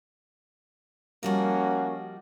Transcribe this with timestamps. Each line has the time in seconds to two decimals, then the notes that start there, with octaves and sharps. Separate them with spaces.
1.23 F3 G3 A#3 C#4 F#4 D#5